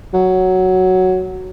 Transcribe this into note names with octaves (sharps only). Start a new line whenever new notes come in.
F#3